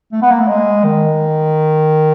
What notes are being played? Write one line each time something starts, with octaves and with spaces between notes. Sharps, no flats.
A3
B3
A#3
A3
G#3
D#3